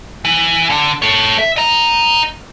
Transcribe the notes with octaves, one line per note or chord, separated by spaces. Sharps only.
E3
D3
A4 C#5
E5
D#5 A#5